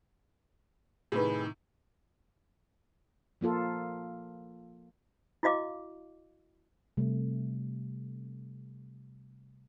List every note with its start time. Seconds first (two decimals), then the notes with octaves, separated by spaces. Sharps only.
1.12 A2 C3 D#3 G#4 B4
3.41 F3 A#3 F4 A4
5.43 E4 F#4 D#5 F5 D6
6.97 C3 G3 A3